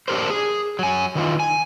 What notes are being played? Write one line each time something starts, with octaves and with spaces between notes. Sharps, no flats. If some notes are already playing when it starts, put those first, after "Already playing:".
D4 G4 A#4 C5
G#4
F#3 G#5
D#3 E3 F4
G#5